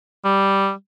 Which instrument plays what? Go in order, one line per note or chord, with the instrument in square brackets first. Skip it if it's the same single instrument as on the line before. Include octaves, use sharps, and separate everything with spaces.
[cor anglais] G3